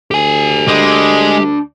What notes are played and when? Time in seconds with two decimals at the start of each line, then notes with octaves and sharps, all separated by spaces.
0.11 D2 G4 G#5
0.68 G#3 D4 G5